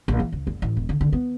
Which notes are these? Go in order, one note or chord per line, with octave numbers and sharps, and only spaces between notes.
A#1
E3
C#2
F#1
A1
E1
D3
D3
B3